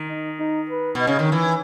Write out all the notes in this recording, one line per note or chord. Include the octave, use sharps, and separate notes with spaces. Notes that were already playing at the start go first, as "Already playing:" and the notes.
Already playing: D#3
D#4
D#4
B4
B2
D#5
C#3
D#3
E3